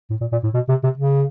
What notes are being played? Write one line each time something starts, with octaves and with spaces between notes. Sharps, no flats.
A2
A#2
A#2
A2
B2
C3
C3
C#3